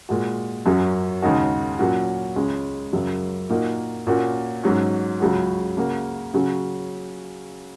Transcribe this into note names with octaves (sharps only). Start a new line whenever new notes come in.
A#2 G#3 F#4
F#2 F#3 C#4 F#4
D#2 C#3 G#3 D#4 F#4
A#2 F#3 C#4 F#4
C#2 C#3 G#3 C#4
F#2 C#3 F#3
A#2 A#3 D#4 F#4
A#2 A#3 C#4 F#4
G#2 F#3 C#4
C#2 C#3 F#3 C#4 F#4
C#3 A#3 F#4
C#3 F#3 C#4 F#4